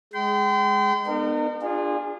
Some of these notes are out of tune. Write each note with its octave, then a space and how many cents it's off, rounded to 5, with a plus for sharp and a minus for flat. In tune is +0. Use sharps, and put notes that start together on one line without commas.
G#3 +0 G5 -30 C6 -40
B3 +0 D#4 -45 A#4 -35
D4 +15 F4 +0 G#4 -25